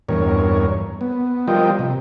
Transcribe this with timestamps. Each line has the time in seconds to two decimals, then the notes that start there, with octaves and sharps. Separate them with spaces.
0.09 E2 G2 A#4 C#5
1.01 B3
1.48 F3 G3 F4 A#4 D#5 G5
1.79 C3